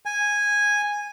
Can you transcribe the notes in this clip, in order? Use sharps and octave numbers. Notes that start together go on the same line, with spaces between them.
G#5